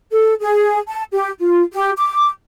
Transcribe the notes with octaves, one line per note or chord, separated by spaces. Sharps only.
A4
G#4
A5
G4
F4
G4
D6